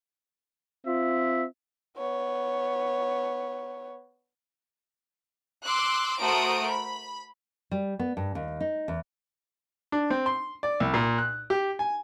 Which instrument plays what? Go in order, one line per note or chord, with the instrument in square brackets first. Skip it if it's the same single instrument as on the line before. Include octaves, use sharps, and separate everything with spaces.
[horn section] C4 F4 E5
[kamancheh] B3 C#5
[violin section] C6 D6 E6 F#6
A3 F#4 A#4 C5 D#6 D7
B5
[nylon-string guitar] G3
B3
G2
D#2
D#4
E2
[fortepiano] D4
C4
C6
D5
C2
A#2
F#6
G4
G#5